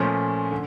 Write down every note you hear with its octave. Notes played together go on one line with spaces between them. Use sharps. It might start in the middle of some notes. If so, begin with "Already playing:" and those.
Already playing: A#2 F3 A3 C#4 C6
D3